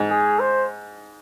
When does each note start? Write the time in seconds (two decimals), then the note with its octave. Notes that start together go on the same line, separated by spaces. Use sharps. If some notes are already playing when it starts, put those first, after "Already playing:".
Already playing: G#2
0.10 G#4
0.40 C5